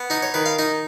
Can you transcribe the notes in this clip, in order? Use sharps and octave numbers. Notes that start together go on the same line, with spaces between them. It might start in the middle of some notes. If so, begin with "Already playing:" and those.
Already playing: B3
D#4 D#5
C#5
D#3 B4
F5
D#4 D#5